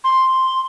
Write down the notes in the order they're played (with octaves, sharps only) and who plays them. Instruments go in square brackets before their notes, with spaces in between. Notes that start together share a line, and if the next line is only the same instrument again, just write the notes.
[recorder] C6